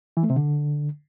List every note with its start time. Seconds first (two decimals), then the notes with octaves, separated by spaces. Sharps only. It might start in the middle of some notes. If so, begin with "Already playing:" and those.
0.17 E3
0.23 A3
0.30 C3
0.36 D3